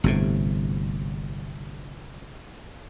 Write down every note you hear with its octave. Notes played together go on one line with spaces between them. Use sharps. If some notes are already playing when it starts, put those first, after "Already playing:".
G1 A2 C3